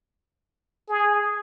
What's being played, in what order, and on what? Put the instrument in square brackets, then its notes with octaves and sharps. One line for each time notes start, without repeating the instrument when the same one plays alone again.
[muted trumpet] G#4